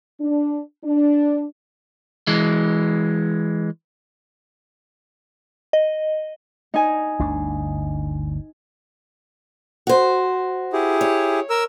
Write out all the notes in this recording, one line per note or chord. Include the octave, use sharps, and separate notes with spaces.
D4
D4
E3 G#3
D#5
D#4 G#5
G1 D2 D4
F#4 C5
E4 G4 G#4
C#5
A#4 E6